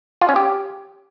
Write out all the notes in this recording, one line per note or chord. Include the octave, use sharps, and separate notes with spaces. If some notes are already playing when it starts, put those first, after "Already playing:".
F4
C#4
G4